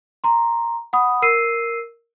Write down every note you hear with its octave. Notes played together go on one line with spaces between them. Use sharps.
A#5 C6
F#5 B5 D#6
A#4 E6 C7 D#7